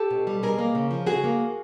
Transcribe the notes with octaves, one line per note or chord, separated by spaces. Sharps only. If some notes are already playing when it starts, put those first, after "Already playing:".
Already playing: G4 A4
B2
G3
B2 G#4 A#4
A#3
C#3
F3
C#3 F#4 G#4
A#3